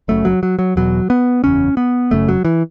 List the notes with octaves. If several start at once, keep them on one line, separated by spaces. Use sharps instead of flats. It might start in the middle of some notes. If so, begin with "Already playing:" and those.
F#1 F#2 C#3 A3
F#3
F#3
F#3
E1 E2 B2 F#3
B3
F#1 E2 C#3 C#4
B3
F#1 F#2 C#3 A3
F#3
E3